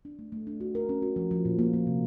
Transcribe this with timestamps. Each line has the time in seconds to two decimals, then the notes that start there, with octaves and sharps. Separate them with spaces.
0.05 D4
0.19 A3
0.32 A3
0.47 D4
0.60 F#4
0.75 A#4
0.89 C#4
1.02 F#4
1.16 F3
1.31 F3
1.45 A#2
1.59 A#3
1.73 A#3
1.87 C3